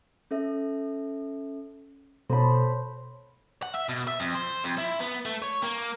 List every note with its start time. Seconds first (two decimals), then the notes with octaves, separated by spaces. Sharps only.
0.31 C#4 A4 E5
2.30 B2 A4 C5 C#5 A5 B5
3.63 F#5
3.74 E5
3.89 B2
4.07 E5
4.20 F2
4.35 C5
4.64 F2
4.78 E4
5.00 B3
5.25 A3
5.42 C#5
5.63 A#3